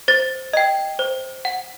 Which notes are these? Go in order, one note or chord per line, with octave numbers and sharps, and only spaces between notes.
C5 A6
D#5 G5
C5
F#5